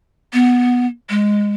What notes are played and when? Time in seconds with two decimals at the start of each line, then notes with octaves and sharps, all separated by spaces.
0.33 B3
1.10 G#3